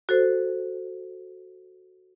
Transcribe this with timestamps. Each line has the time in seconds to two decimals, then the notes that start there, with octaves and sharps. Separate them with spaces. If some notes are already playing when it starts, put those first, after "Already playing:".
0.09 F#4 A4 C5